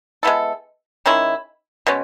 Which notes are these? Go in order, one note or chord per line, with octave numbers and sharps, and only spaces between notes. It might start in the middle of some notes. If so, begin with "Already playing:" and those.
G#3 B3 E4 A4
D#3 G#3 C#4 E4
B2 G#3 C#4